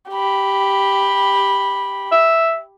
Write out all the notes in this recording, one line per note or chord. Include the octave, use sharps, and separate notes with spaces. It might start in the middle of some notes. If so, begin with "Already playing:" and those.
G4 B5
E5